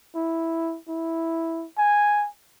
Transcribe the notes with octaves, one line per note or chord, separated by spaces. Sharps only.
E4
E4
G#5